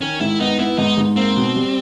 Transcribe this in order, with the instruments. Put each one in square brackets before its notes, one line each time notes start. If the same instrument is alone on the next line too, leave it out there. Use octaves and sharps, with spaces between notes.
[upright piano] D#3 [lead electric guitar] C#4
[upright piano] G#2 [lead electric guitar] E4
[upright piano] B3 [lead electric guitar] D#4
[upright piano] B3 [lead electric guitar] E4
[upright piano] G#2 [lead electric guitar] D#4
[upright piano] G#2
[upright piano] A#3 [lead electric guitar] C4
[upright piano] B2
G3